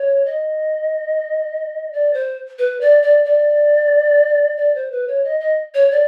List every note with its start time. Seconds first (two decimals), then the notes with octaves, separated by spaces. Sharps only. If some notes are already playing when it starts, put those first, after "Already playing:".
Already playing: C#5
0.25 D#5
1.93 D5
2.14 C5
2.59 B4
2.81 D5
3.03 D5
3.25 D5
4.57 D5
4.75 C5
4.92 B4
5.08 C#5
5.24 D#5
5.40 D#5
5.74 C#5
5.91 D5